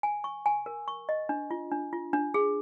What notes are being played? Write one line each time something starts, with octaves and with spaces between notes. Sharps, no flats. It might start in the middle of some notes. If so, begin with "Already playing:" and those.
G#5
C#6
G#5
A#4
C#6
D#5
D4
F4
D4
F4
D4
G#4